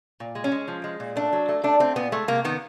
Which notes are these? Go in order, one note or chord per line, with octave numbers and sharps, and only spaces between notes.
A#2
G#3
C#4
G#3
F3
G#3
A#2
A3 D4
F#3
A3
A3 D4
A3 C4
A#2 B3
G#3 A3
C3 A#3
D#3 B3